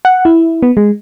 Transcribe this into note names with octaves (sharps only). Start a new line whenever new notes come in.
F#5
E4
B3
G#3